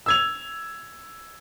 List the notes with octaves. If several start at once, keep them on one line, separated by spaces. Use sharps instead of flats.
E6 G#6 F7